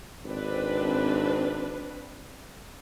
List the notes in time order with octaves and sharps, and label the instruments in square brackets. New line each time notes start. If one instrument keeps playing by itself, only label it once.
[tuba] G#1 [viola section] C4 D4 B4